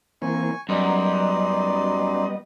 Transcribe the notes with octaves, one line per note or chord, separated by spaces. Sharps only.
E3 A#3 C4 G#5 C#6
F#2 G3 B3 D#4 D5 D#5 C6